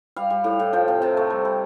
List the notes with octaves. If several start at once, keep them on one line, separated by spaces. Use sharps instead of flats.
G3 F5
G3
A2
A2
F3 G5
C3 G5
C3 A5
A3
G3
G3